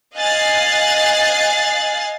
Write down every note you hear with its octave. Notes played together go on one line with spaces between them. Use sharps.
D#5 F5 G#5 F#6 A6 C7